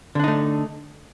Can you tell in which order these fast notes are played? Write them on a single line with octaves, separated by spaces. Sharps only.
D3 D4 D#4 A3